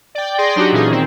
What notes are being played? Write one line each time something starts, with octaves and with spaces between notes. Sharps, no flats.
D5 G5
G#4 D5 G5 C6 A#6
F#3 D4 D#4 F#4 G4
A#2 E3 C#4 D#4 G#4
D#3 C4